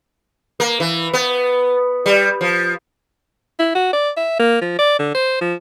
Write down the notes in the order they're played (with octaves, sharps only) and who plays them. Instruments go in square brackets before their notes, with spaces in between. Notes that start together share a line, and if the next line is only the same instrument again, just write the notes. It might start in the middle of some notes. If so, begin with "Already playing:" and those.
[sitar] A#3
E3
B3
G3
F3
[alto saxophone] E4
F#4
D5
E5
A#3
F3
D5
D3
C5
F3